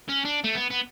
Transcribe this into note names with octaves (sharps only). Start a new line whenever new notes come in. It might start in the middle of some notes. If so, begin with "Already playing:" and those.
C#4
D4
A3
B3
B3